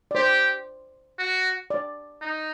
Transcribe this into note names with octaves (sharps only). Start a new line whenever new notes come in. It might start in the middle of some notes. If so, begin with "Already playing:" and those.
D5
G4 C5
F#4
D5
D#4